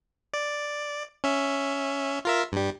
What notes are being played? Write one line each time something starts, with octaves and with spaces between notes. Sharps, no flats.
D5
C#4 E5
F4 A#4 E5
G2 G3